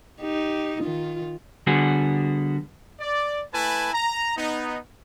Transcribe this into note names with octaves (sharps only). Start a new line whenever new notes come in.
D#4 G4
D#3 F4
D3 G3 B3 F#4 G#4
D5
A3 E4 B4 G#5 A5
A#5
B3 D#4